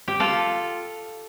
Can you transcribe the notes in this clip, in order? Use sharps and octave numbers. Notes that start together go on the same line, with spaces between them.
G4
F4 A4